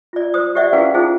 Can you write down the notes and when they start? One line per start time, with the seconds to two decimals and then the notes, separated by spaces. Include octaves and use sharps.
0.13 F4 D5
0.34 C5 D#6
0.55 G4 C5 D5 E5 F#5
0.73 C#4 E4 G#4 B4 F5 F#5
0.94 D#4 F4 G#4 A4 C5